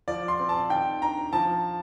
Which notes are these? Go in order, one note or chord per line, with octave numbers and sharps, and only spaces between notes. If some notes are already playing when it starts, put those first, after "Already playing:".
F3 D5
C6
C4
A5
D#3 G5
D4 A#5
F3 A5